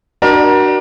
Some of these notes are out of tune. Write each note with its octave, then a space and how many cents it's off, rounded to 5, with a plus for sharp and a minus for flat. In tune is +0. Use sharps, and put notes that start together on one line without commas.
D4 +25 F#4 +25 A#4 +30